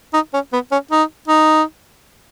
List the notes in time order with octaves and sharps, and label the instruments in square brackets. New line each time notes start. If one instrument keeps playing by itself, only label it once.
[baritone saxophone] D#4
C#4
B3
C#4
D#4
D#4